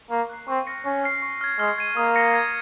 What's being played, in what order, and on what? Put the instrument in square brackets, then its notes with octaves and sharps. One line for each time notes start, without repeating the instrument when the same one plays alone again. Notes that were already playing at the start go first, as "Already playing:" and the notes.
[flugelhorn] A#3 [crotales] C#6
[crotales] F#6 C7
[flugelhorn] C4 [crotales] C#6
[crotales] F6 A#6 C#7
[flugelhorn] C#4 [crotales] C#6
[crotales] F6 C7
C#6
F6 G#6
[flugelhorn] G#3 [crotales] F6
[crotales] G#6 D#7
[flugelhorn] A#3 [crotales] D#6
[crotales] A#6 C#7
G#6